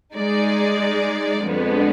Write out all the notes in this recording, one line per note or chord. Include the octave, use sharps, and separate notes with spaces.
G#3 D#4 G#4 D5
F2 D3 G#3 B3